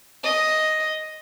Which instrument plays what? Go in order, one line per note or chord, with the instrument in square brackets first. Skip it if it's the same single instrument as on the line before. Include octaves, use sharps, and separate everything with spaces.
[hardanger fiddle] D#5